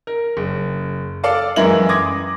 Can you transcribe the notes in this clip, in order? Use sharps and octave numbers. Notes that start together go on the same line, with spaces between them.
A#4
F#1
A4 D5 F5 A5
F#2 E3 G#3 E4 A#4 F#7
C6 D6 D#6 G#6 A#6